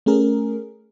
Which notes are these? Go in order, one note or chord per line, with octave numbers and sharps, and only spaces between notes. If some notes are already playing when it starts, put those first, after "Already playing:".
A3 C#4 G#4 A#4